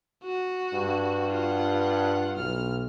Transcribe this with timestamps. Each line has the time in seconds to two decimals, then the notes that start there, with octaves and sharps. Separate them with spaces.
0.24 F#4
0.74 G2
1.32 F4 F#5
2.37 B1 F6